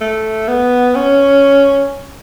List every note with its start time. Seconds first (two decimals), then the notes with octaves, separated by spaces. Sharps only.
0.01 A3
0.48 B3
0.95 C#4